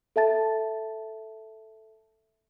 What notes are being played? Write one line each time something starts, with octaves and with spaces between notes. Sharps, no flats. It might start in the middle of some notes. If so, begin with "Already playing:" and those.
A4 E5 A5 A6